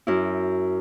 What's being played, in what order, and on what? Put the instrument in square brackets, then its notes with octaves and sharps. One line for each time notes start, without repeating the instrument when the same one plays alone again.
[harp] F#2 E4